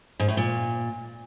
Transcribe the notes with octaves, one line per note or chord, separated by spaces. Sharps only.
G#2
A2
A#2